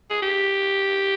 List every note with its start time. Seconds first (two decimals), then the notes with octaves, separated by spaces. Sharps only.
0.10 G#4
0.22 G4